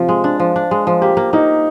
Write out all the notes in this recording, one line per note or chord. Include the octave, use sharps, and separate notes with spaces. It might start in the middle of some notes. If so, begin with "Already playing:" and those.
Already playing: C3 F3 F4
G#3
D4
F3
D4
G#3
F3
A#3 G4
A#3
A#3 D#4